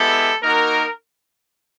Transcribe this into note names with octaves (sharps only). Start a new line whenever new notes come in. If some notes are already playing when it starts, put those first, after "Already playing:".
Already playing: G#3 B3 E4 G4 A4
A#3 D#4 F#4 A#4